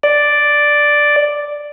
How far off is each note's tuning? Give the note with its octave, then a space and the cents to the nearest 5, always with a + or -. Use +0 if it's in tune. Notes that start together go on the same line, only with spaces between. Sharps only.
D5 +0